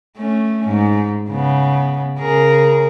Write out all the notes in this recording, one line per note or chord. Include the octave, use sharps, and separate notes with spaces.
A3 C#4
G#2
C#3 B3
C#3 G#4 A#4